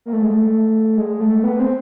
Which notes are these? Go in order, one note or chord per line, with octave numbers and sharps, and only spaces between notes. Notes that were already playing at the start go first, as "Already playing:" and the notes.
A#3
A3
G#3
A3
G#3
A3
B3
C4